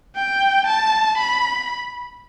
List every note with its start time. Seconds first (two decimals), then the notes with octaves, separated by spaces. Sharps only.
0.16 G5
0.67 A5
1.18 B5